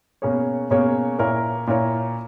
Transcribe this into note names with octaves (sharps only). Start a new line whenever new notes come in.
B2 A#3 C#4 G#4 C#5
B2 A#3 C#4 G#4 C#5
A#2 A#3 E4 A#4 C#5
A#2 A#3 E4 A#4 C#5